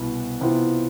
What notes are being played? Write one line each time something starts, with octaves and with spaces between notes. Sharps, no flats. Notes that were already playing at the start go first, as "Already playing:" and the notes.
Already playing: C2 B2 B3 E4
C3 E3 B3 F4